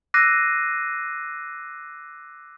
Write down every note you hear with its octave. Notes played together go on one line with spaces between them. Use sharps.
D6 E6 F#6 A#6 C7 D#7